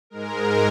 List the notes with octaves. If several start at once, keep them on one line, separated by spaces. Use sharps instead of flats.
G#2 G#3 A#4